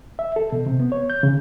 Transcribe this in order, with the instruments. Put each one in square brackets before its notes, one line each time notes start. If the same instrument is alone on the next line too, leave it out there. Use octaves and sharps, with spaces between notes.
[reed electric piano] E5
A4
B2
C3
B3
C#5
G6
C#3